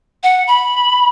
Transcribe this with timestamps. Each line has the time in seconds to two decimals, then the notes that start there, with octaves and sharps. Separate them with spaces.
0.23 F#5
0.47 B5